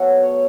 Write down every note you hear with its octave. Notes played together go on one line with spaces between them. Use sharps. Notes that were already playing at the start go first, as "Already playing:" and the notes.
Already playing: B2 F#3 A3 A4
C#5